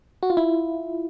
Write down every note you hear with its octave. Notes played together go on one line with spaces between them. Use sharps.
F#4
F4
E4